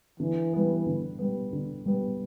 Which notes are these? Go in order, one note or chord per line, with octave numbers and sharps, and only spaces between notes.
D3 E3
G3 B3
D3
G3 B3
D3
G3 B3